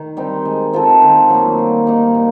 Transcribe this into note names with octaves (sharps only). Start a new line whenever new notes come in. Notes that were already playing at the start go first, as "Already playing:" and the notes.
Already playing: D#3
G3 C4 D#4
G#3
C4 F4 A4
D#3
F#3 A#3
G3
A#3 D#4
A#2